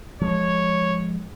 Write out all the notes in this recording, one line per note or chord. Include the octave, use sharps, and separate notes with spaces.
F3 G#3 C#5